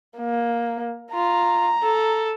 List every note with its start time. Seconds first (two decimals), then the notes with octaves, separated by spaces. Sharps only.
0.19 A#3
1.14 F4 A#5
1.83 A4